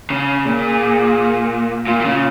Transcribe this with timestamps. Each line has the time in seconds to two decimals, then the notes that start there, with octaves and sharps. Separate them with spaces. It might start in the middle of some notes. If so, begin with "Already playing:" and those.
0.10 C#3
0.45 A#2 G#4
1.87 A#2 F4
2.00 A#2
2.05 C#3